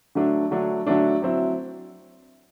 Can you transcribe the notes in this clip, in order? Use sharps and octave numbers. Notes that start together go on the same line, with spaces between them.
D3 F#3 A3 D4
D3 F#3 A3 D4
D3 F#3 A3 D4
F#3 C4 E4